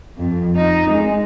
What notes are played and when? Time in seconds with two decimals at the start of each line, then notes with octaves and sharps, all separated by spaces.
0.17 F2
0.56 D#4
0.91 G#3